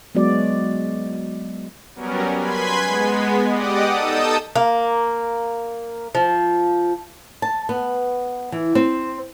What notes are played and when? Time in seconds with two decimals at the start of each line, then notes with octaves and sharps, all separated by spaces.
0.15 F#3 G#3 B3 F#4 D5
1.95 F#3 G3 B3 C#4 A#4
2.38 B4 G#5 B5 C6 G#6 B6
2.84 G#3 B3
3.49 G4 D5 D#5 F#5 D6 D#6
3.91 D#4 A4 A5 D#6 E6 G6
4.56 A#3
6.15 F3
7.42 A5
7.69 B3
8.52 E3
8.75 C4